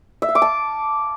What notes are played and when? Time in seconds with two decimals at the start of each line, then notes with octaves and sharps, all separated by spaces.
0.22 E5
0.29 F5
0.35 D6
0.42 A5